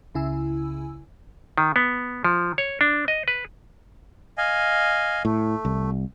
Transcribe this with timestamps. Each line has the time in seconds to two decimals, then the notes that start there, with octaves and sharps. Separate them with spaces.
0.15 C#2 C#3 E4 G#5 E6
1.58 D#3
1.76 B3
2.24 F3
2.58 C#5
2.81 D4
3.08 D#5
3.28 B4
4.38 D#5 F5 G#5
5.25 A2 A3
5.65 C2